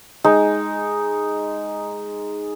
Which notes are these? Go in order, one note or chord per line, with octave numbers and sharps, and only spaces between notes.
G#3 D#4